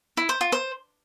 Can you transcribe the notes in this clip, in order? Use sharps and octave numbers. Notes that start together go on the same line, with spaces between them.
E4
C5
F4
C5